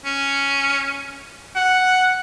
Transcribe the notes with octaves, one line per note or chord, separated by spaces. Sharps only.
C#4
F#5